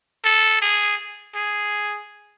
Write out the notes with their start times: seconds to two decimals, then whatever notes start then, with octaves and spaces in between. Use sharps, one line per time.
0.25 A4
0.62 G#4
1.35 G#4